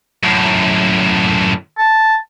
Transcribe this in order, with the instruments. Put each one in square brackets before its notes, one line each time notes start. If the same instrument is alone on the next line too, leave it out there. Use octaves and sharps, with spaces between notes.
[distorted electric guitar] F#2 A2
[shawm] A5